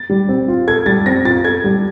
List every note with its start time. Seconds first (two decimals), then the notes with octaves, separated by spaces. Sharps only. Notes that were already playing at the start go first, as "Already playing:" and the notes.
Already playing: A6
0.10 G3
0.29 C4
0.48 F4
0.67 A4 G#6
0.86 G3 A6
1.06 C4 A#6
1.25 F4 A6
1.44 A4 G#6
1.64 G3